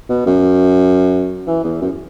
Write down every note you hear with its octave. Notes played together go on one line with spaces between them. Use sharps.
B2
F#2
E3
E2
F#2